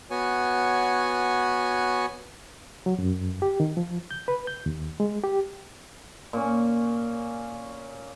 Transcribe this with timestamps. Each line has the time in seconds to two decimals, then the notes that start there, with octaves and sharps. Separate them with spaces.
0.11 B3 F#4 C#5 G#5
2.86 F#3
2.99 F#2
3.42 G4
3.60 D#3
3.77 F3
4.11 G6
4.28 B4
4.47 G6
4.66 D#2
5.00 G#3
5.24 G4
6.33 A#2 C#4